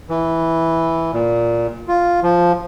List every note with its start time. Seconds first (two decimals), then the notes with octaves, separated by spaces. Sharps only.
0.09 E3
1.13 A#2
1.88 F4
2.23 F3